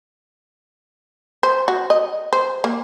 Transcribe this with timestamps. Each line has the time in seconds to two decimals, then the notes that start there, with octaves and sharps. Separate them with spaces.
1.43 C5
1.68 F#4
1.90 D#5
2.33 C5
2.64 A#3